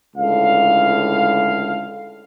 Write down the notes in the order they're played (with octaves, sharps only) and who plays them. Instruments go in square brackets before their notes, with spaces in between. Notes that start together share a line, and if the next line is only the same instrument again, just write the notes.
[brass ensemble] C#2 A2 D3 F5